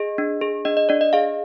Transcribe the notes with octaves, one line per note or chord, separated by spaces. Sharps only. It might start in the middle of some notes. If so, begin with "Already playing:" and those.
Already playing: G#4 D#5
D4
G#4
D4 D#5
D#5
D4 D5
D#5
G#4 F5